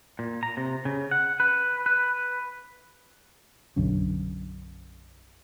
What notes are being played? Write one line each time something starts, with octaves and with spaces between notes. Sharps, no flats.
A#2
A#5
C3
C#3
F#5
B4
B4
B1 F#2 D3 C#4